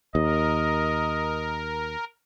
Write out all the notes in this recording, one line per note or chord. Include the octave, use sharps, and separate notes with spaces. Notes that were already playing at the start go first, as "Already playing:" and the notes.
D#2 A#4 D#5